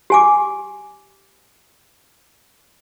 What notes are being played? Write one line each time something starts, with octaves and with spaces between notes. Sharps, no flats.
G4 G#5 D6